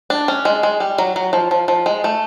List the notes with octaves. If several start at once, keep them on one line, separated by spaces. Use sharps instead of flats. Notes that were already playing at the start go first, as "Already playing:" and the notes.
D4
C#4
G#3
G#3
G3
F#3
F#3
F3
F3
F3
G#3
A3